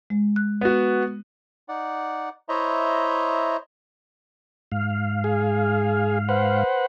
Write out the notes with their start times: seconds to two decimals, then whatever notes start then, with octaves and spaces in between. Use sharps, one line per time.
0.10 G#3
0.36 F#6
0.61 B3 F#4
1.69 D#4 D5 F#5
2.49 E4 C5 C#5 D#5 E5 A#5
4.72 G#2 F5
5.24 G#4
6.29 B4 C5 F#5